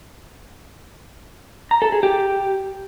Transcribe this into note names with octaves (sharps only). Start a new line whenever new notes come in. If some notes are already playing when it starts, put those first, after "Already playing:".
A#5
A4
G#4
G4